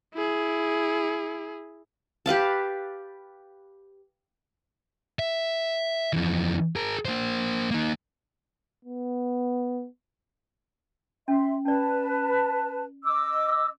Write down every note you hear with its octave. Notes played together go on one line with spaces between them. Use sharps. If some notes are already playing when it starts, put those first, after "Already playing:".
E4 G#4
G4 B4 F5 A5
E5
F2 E3
G#4 A#4
A#3 C5
A#3 D#4
B3
C#4 E5 C6
C#4 B4 D5 A5
D#5 D6 E6